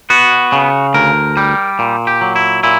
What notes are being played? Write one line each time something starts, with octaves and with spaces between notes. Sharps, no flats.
B3 F#4
C#3
D2 A#4
G3
A#2
G4
F#3
E4
A#2 E4